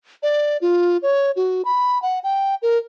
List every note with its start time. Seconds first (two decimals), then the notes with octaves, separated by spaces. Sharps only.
0.23 D5
0.61 F4
1.02 C#5
1.36 F#4
1.65 B5
2.02 F#5
2.24 G5
2.62 A#4